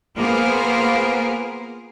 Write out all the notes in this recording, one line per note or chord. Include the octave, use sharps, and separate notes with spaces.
A#3 B3 F4 G#4 A#4 C5